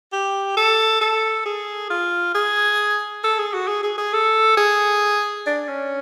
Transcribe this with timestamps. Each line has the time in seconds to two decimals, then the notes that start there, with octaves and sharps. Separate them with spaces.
0.13 G4
0.57 A4
1.01 A4
1.46 G#4
1.90 F4
2.35 G#4
3.24 A4
3.39 G#4
3.54 F#4
3.68 G#4
3.83 G#4
3.98 G#4
4.13 A4
4.57 G#4
5.47 D4
5.68 C#4